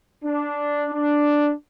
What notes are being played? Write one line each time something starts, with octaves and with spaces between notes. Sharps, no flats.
D4
D4